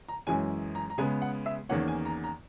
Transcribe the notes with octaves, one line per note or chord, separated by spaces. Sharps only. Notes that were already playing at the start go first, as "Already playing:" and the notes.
A#5
F#2 E3 G#3 C#4 G#5
A#5
A#5
C#3 G#3 B3 G#5
F#5
E5
E2 D#3 A#3 C#4 F#5
G#5
A#5
A#5